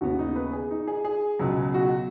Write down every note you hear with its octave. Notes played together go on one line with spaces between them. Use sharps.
D#2 C#3 B3 F#4
D#4
B4
G#4
D#4
G#4
G#4
C#2 B2 F#3 B3
F#4